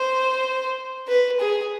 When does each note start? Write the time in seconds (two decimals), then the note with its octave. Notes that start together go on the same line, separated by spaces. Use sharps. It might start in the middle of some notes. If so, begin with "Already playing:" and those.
Already playing: C5
1.08 B4
1.40 G#4